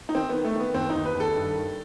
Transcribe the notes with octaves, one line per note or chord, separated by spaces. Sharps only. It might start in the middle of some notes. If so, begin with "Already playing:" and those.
D#4
D#3 C4
D#3 B3
A3
D#3
B3
D#2 C4
D#4
D#2
B4
D#2
A4
G2
D#3